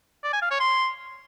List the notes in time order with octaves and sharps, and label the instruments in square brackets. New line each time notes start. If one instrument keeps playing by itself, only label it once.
[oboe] D5
G#5
F5
C#5
C6